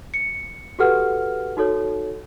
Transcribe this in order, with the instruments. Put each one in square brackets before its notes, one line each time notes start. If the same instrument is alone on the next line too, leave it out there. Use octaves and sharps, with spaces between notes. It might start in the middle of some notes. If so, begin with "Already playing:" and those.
[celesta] C#7
F#4 G4 A4 B4 F#5 F6
D#4 F#4 A4 C#5